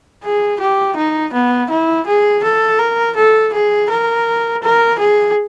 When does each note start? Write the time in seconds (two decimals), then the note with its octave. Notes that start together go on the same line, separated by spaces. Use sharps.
0.23 G#4
0.60 G4
0.97 D#4
1.33 B3
1.70 E4
2.06 G#4
2.44 A4
2.80 A#4
3.16 A4
3.53 G#4
3.90 A#4
4.63 A#4
4.99 G#4